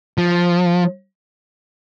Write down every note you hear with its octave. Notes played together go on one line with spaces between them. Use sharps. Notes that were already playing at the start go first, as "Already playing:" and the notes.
F3